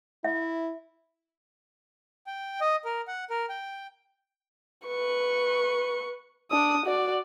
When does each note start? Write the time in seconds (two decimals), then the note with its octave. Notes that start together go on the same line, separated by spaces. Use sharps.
0.24 E4 E5
2.27 G5
2.61 D#5
2.85 A#4
3.07 F#5
3.30 A#4
3.49 G5
4.87 B4 C#6
6.51 D4 D#6
6.86 F#4 D5